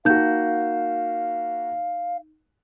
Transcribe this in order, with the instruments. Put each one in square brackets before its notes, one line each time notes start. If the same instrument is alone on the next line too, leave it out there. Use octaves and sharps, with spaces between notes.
[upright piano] A#3 F#4 [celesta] D#4 G6 [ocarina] F5